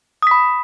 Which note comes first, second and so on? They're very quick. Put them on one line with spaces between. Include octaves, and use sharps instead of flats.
D#6 B6 B5